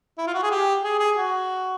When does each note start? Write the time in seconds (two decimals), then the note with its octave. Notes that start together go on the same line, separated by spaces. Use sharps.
0.18 E4
0.27 F4
0.34 F#4
0.43 G#4
0.51 G4
0.83 G#4
0.99 G#4
1.16 F#4